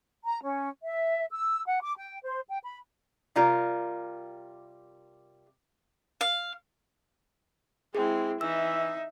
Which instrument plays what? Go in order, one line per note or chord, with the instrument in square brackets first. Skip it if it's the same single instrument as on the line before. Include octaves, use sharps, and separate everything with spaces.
[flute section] A#5
C#4
E5
E6
F#5
D6
G5
C5
G5
B5
[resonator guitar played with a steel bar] C3 G3 F4 A#4 A#5
[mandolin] F5
[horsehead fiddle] G#3 E4 [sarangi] C4 [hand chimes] G#4
[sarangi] E3 [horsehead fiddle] D#4 E5 [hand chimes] E6